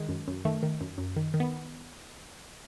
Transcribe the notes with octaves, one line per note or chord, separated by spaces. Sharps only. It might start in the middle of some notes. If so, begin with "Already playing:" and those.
Already playing: D#3 G#3
F#2
F#2
D#3 A3
D#3
F#2
F#2
D#3
D#3
B3